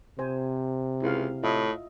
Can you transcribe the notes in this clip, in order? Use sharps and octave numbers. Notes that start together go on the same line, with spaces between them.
C3 C5 G#5
C#2 E4 G#4 F5
A2 F4 D#5 E5